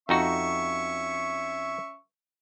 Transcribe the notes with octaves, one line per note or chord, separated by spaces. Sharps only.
F2 C#4 D#4 F#4 E5 C#6